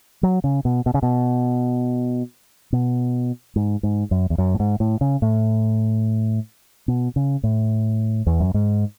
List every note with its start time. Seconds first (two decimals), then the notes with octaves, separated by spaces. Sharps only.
0.23 F#3
0.44 C#3
0.65 B2
0.86 B2
0.94 C#3
1.03 B2
2.73 B2
3.56 G#2
3.83 G#2
4.11 F#2
4.30 E2
4.38 F#2
4.54 A2
4.60 G#2
4.80 A2
5.01 C#3
5.22 A2
6.88 B2
7.16 C#3
7.43 A2
8.26 E2
8.40 F#2
8.54 G#2